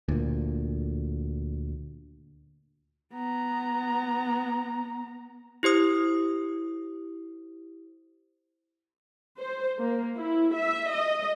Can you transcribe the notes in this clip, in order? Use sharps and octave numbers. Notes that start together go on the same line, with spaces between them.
D2 A#2
B3 A#5
E4 G4 C5 D#6
C5
A#3
E4
E5
D#5